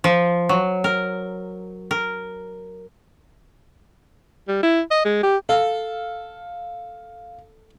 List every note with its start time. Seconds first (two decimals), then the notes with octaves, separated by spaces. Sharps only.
0.04 F3
0.49 F#3
0.84 A#4
1.91 A#4
4.48 G3
4.63 E4
4.91 D#5
5.05 G#3
5.23 G4
5.49 A4 F5